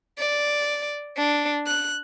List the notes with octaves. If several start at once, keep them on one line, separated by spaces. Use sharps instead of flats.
D5
D4
F#6